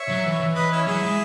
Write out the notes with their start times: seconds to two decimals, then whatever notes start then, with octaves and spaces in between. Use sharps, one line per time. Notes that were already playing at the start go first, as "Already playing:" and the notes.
Already playing: C#5 E5
0.09 F#3
0.25 E3
0.40 E3
0.55 E3 B4 D#5
0.71 C#4 E4
0.86 F#3 E4 G#4
1.03 G#3